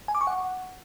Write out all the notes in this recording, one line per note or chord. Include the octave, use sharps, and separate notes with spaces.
G#5
D6
C#6
F#5